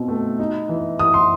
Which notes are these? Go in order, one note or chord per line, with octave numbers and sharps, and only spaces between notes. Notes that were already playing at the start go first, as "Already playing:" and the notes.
Already playing: B2 C4 D#4
A3
D#4
E3
E3 D#6
C6